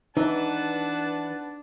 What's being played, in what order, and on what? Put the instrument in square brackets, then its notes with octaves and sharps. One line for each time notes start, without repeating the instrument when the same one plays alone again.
[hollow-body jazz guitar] E3 [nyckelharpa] D4 [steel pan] D#4 [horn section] B4 F#5 A5